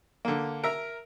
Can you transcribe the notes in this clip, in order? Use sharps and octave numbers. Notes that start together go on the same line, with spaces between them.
D3 A#3
A#4 E5 A#5